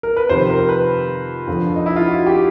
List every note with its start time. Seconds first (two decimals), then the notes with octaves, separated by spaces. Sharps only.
0.03 A#4
0.17 B4
0.29 F2 C3 D#3 C5
0.50 A#4
0.69 B4
1.48 F2 D3 F3
1.76 D#4
1.86 E4
1.96 F4
2.07 F#4
2.26 G4